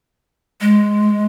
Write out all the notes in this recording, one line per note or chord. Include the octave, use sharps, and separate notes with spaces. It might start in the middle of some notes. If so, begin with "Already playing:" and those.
G#3